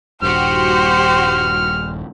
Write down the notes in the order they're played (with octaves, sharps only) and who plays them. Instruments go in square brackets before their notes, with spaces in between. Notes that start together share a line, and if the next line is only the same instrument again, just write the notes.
[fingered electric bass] D#1 G2 [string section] F#4 G4 [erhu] C5 [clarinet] F6